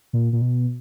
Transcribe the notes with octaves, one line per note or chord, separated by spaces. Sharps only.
A#2
A#2
B2